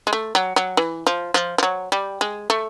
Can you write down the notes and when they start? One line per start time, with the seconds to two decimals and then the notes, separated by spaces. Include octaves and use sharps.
0.07 G#3
0.13 A3
0.35 F#3
0.56 F#3
0.77 E3
1.07 F3
1.34 F3
1.58 F3
1.63 F#3
1.92 G3
2.21 G#3
2.50 A3